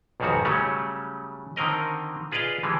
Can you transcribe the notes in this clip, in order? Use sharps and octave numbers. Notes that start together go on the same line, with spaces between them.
B1 F2 G#2 D#3 G3 F#4
C#3 F#3 G3 A3 C#4
D3 D#3 C4 A#4 D#5
F4 G#4 B4 D5 D#5 F5
D3 E3 G3 G#3